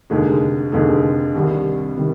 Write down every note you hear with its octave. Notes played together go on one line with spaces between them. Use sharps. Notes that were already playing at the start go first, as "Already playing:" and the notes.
F1 D#2 D3 G#3 D#4
F1 D#2 D3 G#3 D#4
C2 C3 D#3 G3 D4
C3 D#3 G3